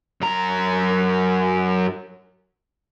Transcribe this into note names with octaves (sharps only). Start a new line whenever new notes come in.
F#2 A#5